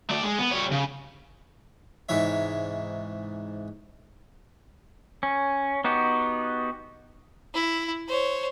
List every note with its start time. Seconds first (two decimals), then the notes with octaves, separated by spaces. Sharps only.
0.10 A3 D5
0.24 G#3
0.39 B3
0.51 G3 C#5
0.72 C#3
2.09 G#2 C3 E3 C#5 E5
5.23 C#4
5.84 B3 D#4 F#4 G4
7.54 E4
8.09 C5 C#5